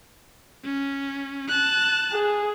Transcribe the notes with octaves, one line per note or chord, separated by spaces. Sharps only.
C#4
A5 F#6
G#4